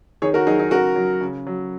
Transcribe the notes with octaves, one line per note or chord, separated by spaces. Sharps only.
D#3 G#4 C#5
F#4 A#4
F#3 D#4 G#4
D#4
C#3 F#4 A#4
F#3
C#3
F#3